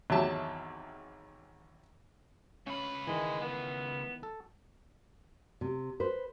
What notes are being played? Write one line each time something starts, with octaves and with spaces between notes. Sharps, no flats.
G#1 E2 F#3 G4 E5 A5
C#2 C#4 B4
D#3 E3 G#3
B3
A4
C3
B4 C5